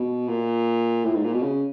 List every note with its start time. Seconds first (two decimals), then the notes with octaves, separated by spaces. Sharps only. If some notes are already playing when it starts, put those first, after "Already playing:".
Already playing: B2
0.28 A#2
1.04 A2
1.14 G#2
1.24 A#2
1.34 B2
1.42 C#3